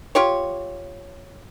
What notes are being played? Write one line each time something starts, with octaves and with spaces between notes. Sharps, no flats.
F4 G4 C#5